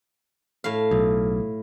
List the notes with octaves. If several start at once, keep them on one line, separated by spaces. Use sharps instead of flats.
A2 F5
B1